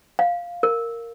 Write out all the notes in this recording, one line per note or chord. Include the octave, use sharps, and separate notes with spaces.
F5
A#4